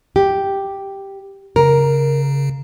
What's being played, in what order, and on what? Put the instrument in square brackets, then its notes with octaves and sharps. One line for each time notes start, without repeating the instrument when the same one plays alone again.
[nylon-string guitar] G4
[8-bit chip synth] C#3 [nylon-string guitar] A#4